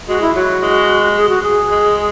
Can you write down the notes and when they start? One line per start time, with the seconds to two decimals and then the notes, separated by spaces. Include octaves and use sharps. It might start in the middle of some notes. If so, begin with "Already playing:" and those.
0.08 G#3 F#4
0.21 E4
0.35 F#3 F#4
0.62 G#3
1.17 G#4
1.29 F#4
1.43 G#4
1.71 G#3